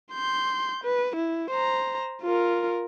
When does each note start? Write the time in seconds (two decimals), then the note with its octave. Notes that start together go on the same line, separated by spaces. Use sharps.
0.13 C6 G6
0.84 B4
1.16 E4
1.50 C5 A#5
2.22 F4 A#4